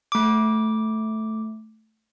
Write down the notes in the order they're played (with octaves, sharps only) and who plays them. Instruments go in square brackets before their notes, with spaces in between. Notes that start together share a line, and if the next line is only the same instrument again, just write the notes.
[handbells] A3 D6